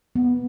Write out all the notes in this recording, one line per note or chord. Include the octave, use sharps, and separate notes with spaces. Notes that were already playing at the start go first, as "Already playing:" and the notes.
B3